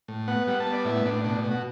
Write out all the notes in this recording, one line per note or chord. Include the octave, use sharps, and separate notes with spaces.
A2
B3 F#5
G3 F#5
A5
B3
D5
A2 E4
A2 D4
B2 D4
B2
F#4